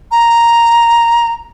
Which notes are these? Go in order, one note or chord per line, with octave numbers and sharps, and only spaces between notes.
A#5